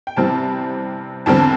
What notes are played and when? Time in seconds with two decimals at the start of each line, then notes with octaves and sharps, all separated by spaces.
0.07 G5
0.17 C3 E3 G3 C4 A5
1.26 E2 D3 G3 C4 A5